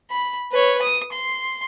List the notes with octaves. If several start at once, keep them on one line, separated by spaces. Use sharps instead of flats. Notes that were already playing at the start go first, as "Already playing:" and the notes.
B5
B4 C#5
D#6
C6